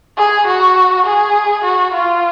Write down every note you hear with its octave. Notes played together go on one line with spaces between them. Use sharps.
G#4
F#4
G#4
F#4
F4